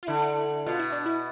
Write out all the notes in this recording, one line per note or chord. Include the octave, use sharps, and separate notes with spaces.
F4
D3 E4
B2 F4
E4
D4
E4